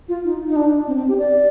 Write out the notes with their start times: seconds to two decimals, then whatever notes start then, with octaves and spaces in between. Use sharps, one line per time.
0.09 F4
0.24 D#4
0.49 D#4
0.56 D4
0.88 C4
0.98 C4
1.08 G4
1.19 D5